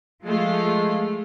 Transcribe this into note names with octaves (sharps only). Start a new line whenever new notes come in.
F3 G#3 A3 F4